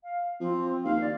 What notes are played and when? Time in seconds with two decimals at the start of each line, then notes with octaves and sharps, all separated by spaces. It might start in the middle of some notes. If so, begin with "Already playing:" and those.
0.03 F5
0.40 F3 C4
0.85 D#2 F5
1.01 D5